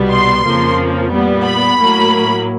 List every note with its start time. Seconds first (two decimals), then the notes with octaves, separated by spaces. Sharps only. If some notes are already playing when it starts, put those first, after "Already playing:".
Already playing: C2 B2 G3 B3
0.10 C6
0.44 F2 C#3 F3 A#3
1.11 A#2 G3 B3
1.43 B5
1.78 A2 F#3 A#3